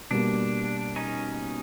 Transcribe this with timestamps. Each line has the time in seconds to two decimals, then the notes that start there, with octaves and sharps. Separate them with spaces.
0.11 B2 G3 A#3 D4
0.96 C#4 D#4